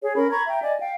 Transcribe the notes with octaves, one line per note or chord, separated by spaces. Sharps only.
G#4 C#5
C#4 A#4 B5
A#5 B5 C#6 G#6
E5 G5 A#5
D5 D#5 G#5
F5 G5